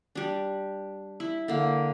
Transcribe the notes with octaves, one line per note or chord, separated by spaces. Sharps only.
G3 D4
E4
D3 A#3